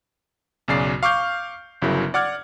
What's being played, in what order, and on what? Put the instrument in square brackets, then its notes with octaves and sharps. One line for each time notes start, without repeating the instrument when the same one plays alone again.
[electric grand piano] B1 F#2 C#3 D5 C7
F5 C#6 D6 F6 G6
G1 C#3 F#3 E4 A#4
D5 F#5 D6 F6 G#6